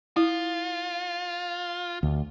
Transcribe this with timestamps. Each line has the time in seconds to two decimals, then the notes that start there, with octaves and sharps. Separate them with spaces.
0.16 E4 F4
2.03 D2